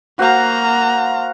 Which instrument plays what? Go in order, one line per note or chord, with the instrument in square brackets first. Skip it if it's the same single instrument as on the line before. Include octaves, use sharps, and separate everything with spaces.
[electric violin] A#3 A#5 [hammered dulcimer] F#4 C5 F5